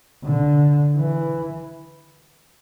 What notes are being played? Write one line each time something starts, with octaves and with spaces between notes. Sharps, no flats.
D3
E3